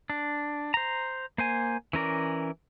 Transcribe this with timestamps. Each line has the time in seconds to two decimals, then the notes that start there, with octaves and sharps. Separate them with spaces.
0.10 D4
0.74 C5 A#5
1.38 A#3 C5 G#5
1.93 E3 C#4 A#4 D5